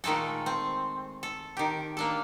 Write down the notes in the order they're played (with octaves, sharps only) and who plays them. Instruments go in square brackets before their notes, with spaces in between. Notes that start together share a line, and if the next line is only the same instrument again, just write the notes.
[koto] A#2 D#3 G#3 A3 A4
C4
A4
D#3 G4
A#3 D4 A4